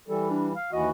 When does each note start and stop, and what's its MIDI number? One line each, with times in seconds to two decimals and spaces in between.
0.08 0.53 52
0.08 0.53 55
0.08 0.28 69
0.30 0.48 62
0.54 0.68 77
0.73 0.90 39
0.73 0.90 52
0.73 0.90 66
0.73 0.89 75